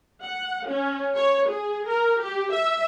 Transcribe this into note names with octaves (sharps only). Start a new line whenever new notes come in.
F#5
C#4
C#5
G#4
A#4
G4
E5